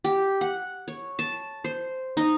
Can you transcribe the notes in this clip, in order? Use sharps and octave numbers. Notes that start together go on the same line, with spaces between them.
G4
F#5
C#5
A5
C5
D#4